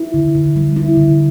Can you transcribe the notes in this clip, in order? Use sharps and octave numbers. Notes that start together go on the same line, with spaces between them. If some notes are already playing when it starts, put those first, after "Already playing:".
Already playing: E4
D3
D3
G3
E4
D3